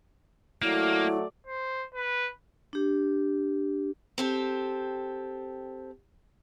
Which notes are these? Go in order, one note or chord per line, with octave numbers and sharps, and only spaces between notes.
F#3 A3 A#3 E4 D5
C5
B4
D4 G4
C4 G4 A4